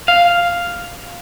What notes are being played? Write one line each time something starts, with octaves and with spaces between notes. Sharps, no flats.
F5